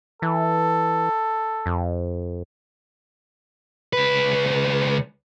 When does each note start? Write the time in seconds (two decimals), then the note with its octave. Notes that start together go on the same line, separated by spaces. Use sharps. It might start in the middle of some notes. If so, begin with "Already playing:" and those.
0.22 E3 A4
1.66 F2
3.93 C#2 B4